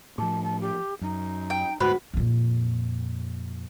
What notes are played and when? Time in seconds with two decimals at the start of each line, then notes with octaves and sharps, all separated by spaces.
0.18 A2 F3 G#4 A5
0.43 A5
0.61 G4
1.01 F#2 D#4
1.50 G5
1.80 D2 G#2 F#4 B4 C5 F#5 B5
2.14 F2 A#2